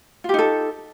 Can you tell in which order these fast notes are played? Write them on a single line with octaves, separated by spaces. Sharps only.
F4 G4 D#4 A4